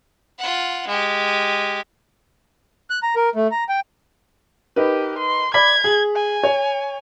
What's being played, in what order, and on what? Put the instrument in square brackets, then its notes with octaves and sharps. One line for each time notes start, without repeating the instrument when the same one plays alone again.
[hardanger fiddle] F4 F#5
G#3 G4
[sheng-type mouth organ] F#6
A#5
A#4
A3
A#5
G5
[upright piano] D#4 A#4 B4 [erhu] G4
[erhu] C6
[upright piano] D5 B5 B6 [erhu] G#6
[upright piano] G#4
[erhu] G#5
[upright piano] C#5